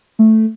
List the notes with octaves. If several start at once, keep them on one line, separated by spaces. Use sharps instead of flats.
A3